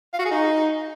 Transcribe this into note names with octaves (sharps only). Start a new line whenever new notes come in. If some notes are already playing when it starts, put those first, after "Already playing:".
F5
F#4
G#4
D#4